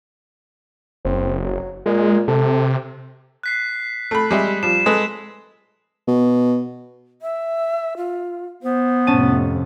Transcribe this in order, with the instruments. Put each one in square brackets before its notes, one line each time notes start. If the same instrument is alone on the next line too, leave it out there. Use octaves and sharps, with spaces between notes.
[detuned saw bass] F#1 [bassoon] C4
[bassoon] F#3
[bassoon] A#2 [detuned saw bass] G#3
[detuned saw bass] C3 [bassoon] A4
[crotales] F#6 B6 C7
[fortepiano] A3 B5
G3 G#3 E5
[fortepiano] F3 G3 [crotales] C7 E7
[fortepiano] G#3 A4 B4
[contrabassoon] B2
[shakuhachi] E5
F4
[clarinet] B3 [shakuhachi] C5
[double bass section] F2 A2 C3 [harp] C#4 A5 D#7